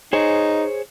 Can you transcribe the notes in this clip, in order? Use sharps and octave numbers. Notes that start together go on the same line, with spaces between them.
D#4 G#4 C5 C#5